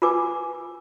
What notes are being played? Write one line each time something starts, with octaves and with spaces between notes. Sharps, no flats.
F4 A#4 B4 G#5 D6